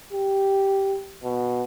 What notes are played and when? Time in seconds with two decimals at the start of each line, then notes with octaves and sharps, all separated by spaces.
0.13 G4
1.23 B2